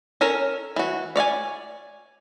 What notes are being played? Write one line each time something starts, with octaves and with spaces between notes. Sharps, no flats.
C#4 A4 A#4 C#5
E3 F#4
C#5 D5 F5 G#5